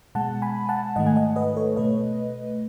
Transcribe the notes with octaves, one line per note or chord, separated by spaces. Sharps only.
B2 G#3 F#5 A5
G#5 B5
F#5 A5
G#2 D#3 A3 D#5 F#5
G#5
D#5 F#5
B4 D#5
A4 C#5
B2 A3 B4 D#5